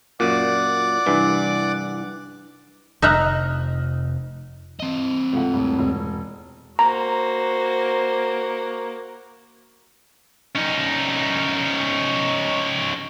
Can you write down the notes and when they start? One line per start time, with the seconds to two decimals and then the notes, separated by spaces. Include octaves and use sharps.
0.20 F#2 A#2 D5 F#5 D6
1.06 C2 G2 E3
3.02 F1 D#4 D#5 E5 A#5 F6 F#6
4.80 C4 D#5
5.33 C#2 A3 F#5
5.53 D#1 A2
5.79 E1
6.79 A#3 F#4 C5 A#5
10.55 C#4 D#4